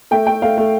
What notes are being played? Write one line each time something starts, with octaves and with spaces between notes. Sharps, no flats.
A3 G5
A3 G5
A3 F5
A3